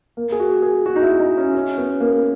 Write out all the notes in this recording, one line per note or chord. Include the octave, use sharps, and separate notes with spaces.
A#3
G#4
F#4
G#4
F#4
D#4
E4
D#4
C#4
C#4
B3
A#3